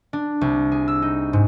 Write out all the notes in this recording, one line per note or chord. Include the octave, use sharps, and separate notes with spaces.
D4
C2
G#4
E6
D#4
G#2